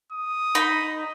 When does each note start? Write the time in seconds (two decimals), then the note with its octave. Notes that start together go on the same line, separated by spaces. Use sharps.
0.12 D#6
0.55 D#4 B5